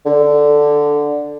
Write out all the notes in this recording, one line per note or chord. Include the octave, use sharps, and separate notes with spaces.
D3